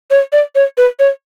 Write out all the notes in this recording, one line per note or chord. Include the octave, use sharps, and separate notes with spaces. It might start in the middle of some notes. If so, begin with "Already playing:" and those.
C#5
D5
C#5
B4
C#5